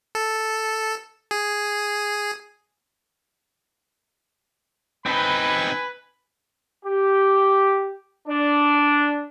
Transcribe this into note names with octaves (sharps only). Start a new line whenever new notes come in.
A4
G#4
C4 D#4 B4 G#5 B5
G4
D4